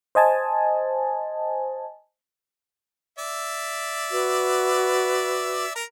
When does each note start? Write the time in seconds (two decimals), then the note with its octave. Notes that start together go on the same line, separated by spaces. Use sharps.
0.15 C5 D#5 G#5 A5
3.18 D5 E5
4.11 F#4 B4
5.76 A#4 A#5